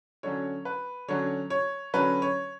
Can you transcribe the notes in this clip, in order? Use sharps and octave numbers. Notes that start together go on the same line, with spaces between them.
D3 F#3 C#4 C#5
B4
D3 F#3 C#4 C#5
C#5
D3 F#3 C#4 B4
C#5